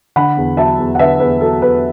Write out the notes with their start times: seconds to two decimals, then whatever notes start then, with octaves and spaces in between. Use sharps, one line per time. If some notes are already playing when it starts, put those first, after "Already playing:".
0.16 D3 F#5 B5
0.37 E2
0.57 F#3 E5 A5
0.79 E2
0.95 F#5
0.99 D3 B4 E5
1.20 E2 B4
1.41 F#3 A4
1.62 E2 B4